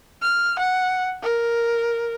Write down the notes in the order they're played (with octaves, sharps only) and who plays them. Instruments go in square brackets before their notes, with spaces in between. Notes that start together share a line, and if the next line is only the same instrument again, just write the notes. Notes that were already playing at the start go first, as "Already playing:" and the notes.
[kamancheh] F6
F#5
A#4